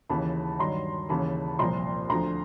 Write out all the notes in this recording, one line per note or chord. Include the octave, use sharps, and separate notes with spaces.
D#2 C#3 E3 A5 B5
G2 D#3 F#3 A#5 C6
D#2 C#3 E3 A5 B5
C2 A#2 F3 A#5 C6
D2 D3 F3 A#5 C6